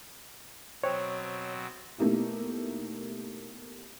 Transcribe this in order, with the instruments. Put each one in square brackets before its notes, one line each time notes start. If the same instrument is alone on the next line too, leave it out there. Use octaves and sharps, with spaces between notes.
[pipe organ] B2 F#3 C4 [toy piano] C5 G5 [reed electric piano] C#5
[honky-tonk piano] B2 A3 A#3 D#4 E4 G4